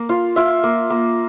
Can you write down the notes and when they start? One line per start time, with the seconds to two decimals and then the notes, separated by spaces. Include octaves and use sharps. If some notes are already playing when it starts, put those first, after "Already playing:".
Already playing: A#3
0.09 F4 F5
0.36 F4 E5
0.63 A#3
0.90 A#3